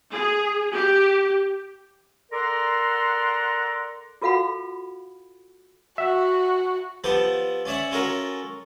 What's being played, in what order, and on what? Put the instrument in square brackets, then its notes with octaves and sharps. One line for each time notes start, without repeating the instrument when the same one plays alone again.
[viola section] G#4
G4
[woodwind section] A4 A#4 D5 F#5 A#5 C6
[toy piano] F4 F#4 A4 F5 F#5 B5
[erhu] F#4 [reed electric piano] E5 F#5
[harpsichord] F3 B3 G4 A4
C#4 D5 E5 F#5
C#4 F4 F#4 A4 A#4